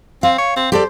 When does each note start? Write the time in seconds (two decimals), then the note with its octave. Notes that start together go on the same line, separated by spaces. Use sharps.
0.23 C4 F5
0.38 C#5
0.56 C4
0.72 G4 A4 C5 D5